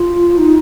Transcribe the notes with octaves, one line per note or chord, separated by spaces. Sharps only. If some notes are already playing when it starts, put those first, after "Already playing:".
Already playing: F4
D#4